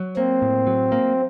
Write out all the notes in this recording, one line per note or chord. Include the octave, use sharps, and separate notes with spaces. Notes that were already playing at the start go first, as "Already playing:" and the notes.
Already playing: F#3
A#3 C4
A2
F#3
A#3